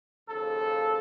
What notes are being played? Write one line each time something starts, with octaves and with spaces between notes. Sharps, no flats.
D#2 C#3 F3 A4